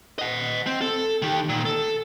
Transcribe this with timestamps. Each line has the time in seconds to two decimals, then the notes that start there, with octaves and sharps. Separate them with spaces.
0.19 D#5 F#5
0.67 C4
0.81 A4
1.22 D#3 G4
1.49 A#2 D#3
1.65 A4